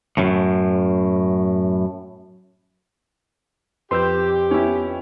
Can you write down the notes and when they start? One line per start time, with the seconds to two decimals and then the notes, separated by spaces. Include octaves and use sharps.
0.17 F#2 A2
3.91 F2 G4 B4 C6 E6 G6
4.51 B3 C#4 E4